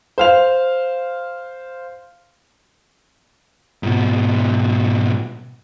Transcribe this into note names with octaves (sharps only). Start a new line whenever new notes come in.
C5 F5 F7
G#2 B2